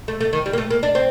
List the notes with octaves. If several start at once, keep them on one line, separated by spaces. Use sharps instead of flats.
A3
A3
D#3
G3
A#3
A3
A#3
D4
C4